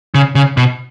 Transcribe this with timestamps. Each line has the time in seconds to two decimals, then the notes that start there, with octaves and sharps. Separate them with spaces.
0.14 C#3
0.35 C#3
0.57 B2